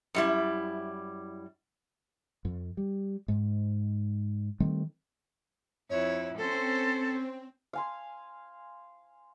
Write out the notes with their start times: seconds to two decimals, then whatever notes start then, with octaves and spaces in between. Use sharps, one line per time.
0.15 F#2 G3 E4
2.45 F2
2.77 G3
3.28 G#2
4.60 D#3 G3 A3 C4
5.90 F2 E4 C#5
6.38 C4 C#4 A4 C5
7.73 F5 G#5 C6